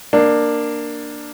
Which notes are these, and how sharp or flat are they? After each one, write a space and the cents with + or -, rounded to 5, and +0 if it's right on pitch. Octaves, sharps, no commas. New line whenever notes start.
A#3 +0 D4 +10